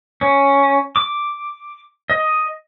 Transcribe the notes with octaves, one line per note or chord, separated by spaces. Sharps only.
C#4
D6
D#5